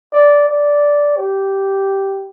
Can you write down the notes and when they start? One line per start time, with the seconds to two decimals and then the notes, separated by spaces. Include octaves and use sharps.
0.13 D5
0.48 D5
1.17 G4